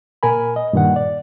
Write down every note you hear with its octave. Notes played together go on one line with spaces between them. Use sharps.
A#2 A#4 G#5 B5
D#5
G2 A#2 D#3 F#5
D5